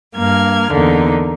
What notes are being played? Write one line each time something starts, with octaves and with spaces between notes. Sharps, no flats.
G2 A#3 F6 G#6
E2 D3 A#3 D#4